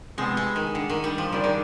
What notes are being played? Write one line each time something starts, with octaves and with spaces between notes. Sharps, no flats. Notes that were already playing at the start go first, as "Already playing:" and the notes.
C3 F3 G#3 B3
G#3
D#3
D3
D#3
G3
F3
D#3 G3 D4 G#4
D#3